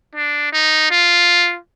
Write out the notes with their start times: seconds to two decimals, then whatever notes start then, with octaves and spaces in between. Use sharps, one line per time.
0.15 D4
0.52 D#4
0.90 F4